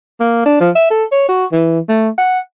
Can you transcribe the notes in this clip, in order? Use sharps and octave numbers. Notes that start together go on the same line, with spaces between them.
A#3
D4
F3
E5
A4
C#5
F#4
E3
A3
F#5